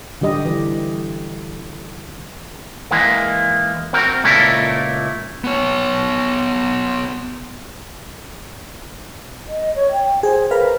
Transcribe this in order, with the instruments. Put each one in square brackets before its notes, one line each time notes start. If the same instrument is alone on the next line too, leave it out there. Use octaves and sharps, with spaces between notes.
[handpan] D3 G3 G4 D#5
E3
[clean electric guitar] E3 G#3 A#3
C4 F#4 A#4
C#2 A#2 A3 E4 A4 A#4
[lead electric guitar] B3 C#5
[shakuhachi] D#5
C#5
G5
[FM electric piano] G#4 [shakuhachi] C5
[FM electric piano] A#4 B4 F5